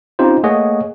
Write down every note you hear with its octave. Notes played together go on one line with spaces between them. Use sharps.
C4 C#4 D#4 F4 G4 C5
A3 A#3 G#4 C#5 D#5 F#5